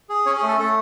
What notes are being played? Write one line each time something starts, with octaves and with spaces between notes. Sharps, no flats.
G#4
C#4 C#5
G#4
A3
A4
A3 A4